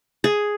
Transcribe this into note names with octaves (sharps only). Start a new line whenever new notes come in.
G#4